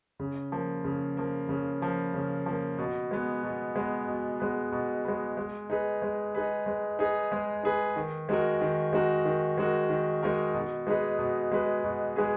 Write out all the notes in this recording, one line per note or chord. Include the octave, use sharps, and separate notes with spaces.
C#3
F3 A#3
C#3
F3 A#3
C#3
F3 A#3
C#3
F3 A#3
B2
G#3 B3
B2
G#3 B3
B2
G#3 B3
B2
G#3 B3
G#3
D#4 G#4 B4
G#3
D#4 G#4 B4
G#3
D#4 G#4 B4
G#3
D#4 G#4 B4
D#3
G#3 D#4 F#4 A#4
D#3
G#3 D#4 F#4 A#4
D#3
G#3 D#4 F#4 A#4
D#3
G#3 D#4 F#4 A#4
B2
G#3 D#4 G#4 B4
B2
G#3 D#4 G#4 B4
B2
G#3 D#4 G#4 B4